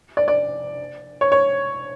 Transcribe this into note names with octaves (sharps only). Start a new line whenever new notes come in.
D5
D5
C#5
C#5